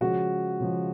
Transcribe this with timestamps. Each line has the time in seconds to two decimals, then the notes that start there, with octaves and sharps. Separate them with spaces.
0.01 C#3 F3 G#3 F#4
0.60 C#3 F3 G#3